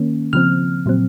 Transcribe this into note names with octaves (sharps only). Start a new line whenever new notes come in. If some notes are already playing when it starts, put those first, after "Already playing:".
Already playing: D#3 A#3 C#4
C#3 F3 C4 F6
A#2 F#3 C4